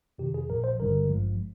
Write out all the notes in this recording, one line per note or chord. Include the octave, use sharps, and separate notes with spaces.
F2 C3 D#3 G4
G#4
A#1 A#2 F3 A#4
C5
G1 G2 D3 G3 A#4
G#1 G2 F3 G#3